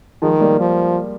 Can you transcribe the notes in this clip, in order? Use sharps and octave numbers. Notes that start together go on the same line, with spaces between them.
D#3 F3 G#3
G3 A#3
F3